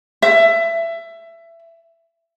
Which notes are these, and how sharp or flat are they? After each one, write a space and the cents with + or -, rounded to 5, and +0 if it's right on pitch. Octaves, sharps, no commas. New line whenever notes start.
E5 +20